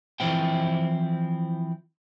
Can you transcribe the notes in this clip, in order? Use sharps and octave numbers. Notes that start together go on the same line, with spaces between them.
E3 F3 C4 E4 G5